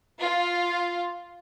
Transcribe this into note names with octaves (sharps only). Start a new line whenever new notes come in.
F4